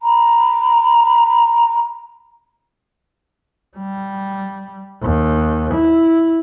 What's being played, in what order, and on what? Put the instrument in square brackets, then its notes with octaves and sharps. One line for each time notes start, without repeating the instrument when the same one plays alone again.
[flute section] A#5 B5
[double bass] G3
D#2
E4